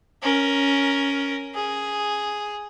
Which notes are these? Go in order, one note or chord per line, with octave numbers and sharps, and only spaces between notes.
C#4 A#4
G#4